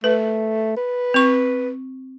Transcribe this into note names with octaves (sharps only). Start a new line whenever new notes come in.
A3 B4
B4
C4 C#6